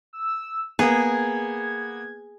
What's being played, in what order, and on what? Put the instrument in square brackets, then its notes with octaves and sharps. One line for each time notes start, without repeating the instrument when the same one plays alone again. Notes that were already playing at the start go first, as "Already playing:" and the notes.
[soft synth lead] E6
[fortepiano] A#3 B3 [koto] G#4 [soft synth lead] G#6